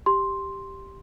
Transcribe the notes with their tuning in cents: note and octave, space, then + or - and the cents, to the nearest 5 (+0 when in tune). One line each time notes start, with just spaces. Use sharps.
G4 +0 C6 +5